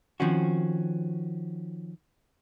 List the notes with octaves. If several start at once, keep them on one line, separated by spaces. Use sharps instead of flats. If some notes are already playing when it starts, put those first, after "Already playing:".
D#3 F3 C4 C#4 F#4